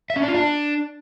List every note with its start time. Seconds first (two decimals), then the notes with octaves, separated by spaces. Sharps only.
0.10 E5
0.16 C#4
0.22 D4
0.28 F4
0.34 D4